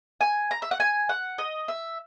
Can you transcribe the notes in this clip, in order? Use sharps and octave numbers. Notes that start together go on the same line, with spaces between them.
G#5
A#5
E5
F#5
G#5
F#5
D#5
E5